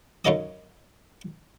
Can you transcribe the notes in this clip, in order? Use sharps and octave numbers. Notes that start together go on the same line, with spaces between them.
F#2 C#3 D#4 A4 D#5 D#6